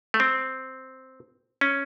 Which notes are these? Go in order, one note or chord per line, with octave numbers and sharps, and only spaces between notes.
A3
C4
C#4